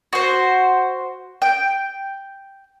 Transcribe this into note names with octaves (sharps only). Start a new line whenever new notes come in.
F#4 C5
G5